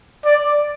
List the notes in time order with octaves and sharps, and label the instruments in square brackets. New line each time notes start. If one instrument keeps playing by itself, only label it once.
[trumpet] D5